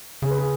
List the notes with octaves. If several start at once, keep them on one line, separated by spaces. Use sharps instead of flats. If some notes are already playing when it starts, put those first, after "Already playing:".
C#3 G#4
B4
G#4